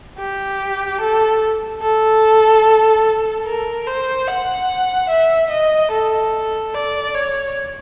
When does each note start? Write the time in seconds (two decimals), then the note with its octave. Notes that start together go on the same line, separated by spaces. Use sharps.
0.19 G4
1.01 A4
1.82 A4
3.46 A#4
3.87 C5
4.28 F#5
5.10 E5
5.50 D#5
5.92 A4
6.74 D5
7.15 C#5